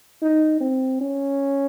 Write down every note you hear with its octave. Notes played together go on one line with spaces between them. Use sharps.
D#4
C4
C#4